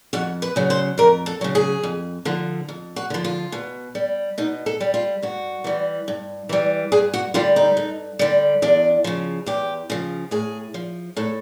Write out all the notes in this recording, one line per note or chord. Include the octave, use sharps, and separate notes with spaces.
F2 F#4
B4
C#3 F#3
C5
F2 A#4
A4
C#3 F#3
G#4
F2
D3 F3
F2
F#4
D3 F3
F4
B2
G3
B2 D#4
A4
G3
F4
G2 F#4
E3 G3
G2
E3 G3
G2 G#4
F#4
D3 G3 F4
D#4
G2
D3 G3
E2 D4
C#3 F3
E2 G4
C#3 F3
A2 G#4
F3
A2 A4